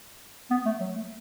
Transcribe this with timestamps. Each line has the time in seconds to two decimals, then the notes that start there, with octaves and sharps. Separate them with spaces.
0.51 B3
0.65 A3
0.80 F#3
0.95 A3